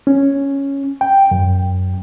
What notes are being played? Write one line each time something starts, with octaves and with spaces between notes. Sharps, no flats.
C#4
G5
F#2